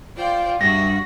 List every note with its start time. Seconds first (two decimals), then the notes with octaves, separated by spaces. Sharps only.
0.17 F4 C5 D5 G5
0.61 G2 F#4 E5 A#6